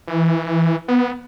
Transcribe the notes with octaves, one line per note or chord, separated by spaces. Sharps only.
E3
B3